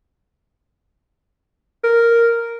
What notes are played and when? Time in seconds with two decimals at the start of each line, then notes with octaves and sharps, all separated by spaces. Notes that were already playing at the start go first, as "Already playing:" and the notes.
1.84 A#4